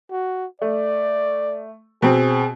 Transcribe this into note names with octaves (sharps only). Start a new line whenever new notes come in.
F#4
A3 D5
B2 C4 G#4